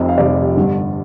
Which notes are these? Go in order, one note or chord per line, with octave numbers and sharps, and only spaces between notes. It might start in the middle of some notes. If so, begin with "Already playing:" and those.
Already playing: F1 F2 C3
F5
F1 F2 C3 D5
G1 G2 D3